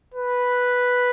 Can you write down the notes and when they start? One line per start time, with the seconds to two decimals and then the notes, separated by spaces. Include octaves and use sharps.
0.14 B4